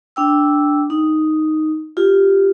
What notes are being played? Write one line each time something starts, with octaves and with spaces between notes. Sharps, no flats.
D4 G5 E6
D#4
F4 G4